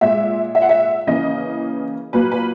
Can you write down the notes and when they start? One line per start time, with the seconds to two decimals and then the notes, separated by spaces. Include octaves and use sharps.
0.01 A#2 G#3 E5
0.55 E5
0.62 F#5
0.69 E5
1.07 C#3 E3 A#3 D#5
2.13 A#2 F#3 A#3 B4
2.32 B4